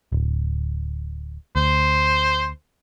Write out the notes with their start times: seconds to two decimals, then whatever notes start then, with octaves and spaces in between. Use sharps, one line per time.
0.12 D1
1.56 D2 C5